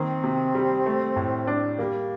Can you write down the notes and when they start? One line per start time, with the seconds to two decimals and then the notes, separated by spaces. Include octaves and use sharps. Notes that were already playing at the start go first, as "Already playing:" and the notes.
Already playing: D#3 A#3 C4
0.24 C3
0.55 G3
0.86 A3
1.16 A2
1.47 D4
1.79 G3 A#3